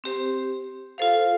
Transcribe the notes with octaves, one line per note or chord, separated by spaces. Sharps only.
C4 G4 C5
F4 A4 C5 F5